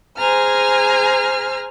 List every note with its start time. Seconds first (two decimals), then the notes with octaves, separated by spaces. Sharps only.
0.16 G#4 C5 G#5 A#5 F6